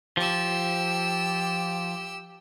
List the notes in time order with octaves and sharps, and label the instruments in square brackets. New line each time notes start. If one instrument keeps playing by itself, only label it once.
[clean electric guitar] F3 [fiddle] G4 E6